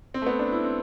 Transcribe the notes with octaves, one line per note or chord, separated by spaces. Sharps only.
C4
A3
B3
D4
E4
C4